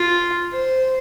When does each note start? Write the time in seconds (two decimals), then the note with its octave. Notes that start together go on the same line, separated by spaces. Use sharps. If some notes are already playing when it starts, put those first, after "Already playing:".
Already playing: F4
0.53 C5